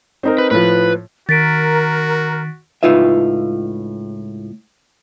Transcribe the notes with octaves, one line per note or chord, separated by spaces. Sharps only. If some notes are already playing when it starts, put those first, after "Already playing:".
C4 D#4 A#4
B4
A2 F3 B4
D#3 F#4 A#4 A6 B6 D7
C#2 A2 D#4 F4 B4 E5